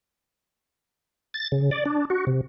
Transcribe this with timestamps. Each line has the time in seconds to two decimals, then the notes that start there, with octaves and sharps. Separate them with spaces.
1.34 A6
1.52 C#3
1.71 D5
1.85 D4
2.10 F#4
2.27 C3